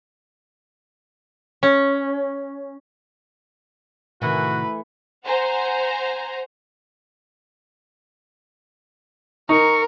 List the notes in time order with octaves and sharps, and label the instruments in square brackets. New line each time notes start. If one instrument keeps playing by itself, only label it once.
[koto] C#4
[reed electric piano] A2 C3 D#3 [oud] E3 A3 A#4 [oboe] F#4 [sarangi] B4
[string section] C5 F#5 G#5 A#5
[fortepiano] D#4 [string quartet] A#4 [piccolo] C#6